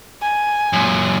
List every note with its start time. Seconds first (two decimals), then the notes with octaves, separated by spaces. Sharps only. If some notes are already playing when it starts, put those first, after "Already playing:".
0.22 G#5
0.73 F#2 A#2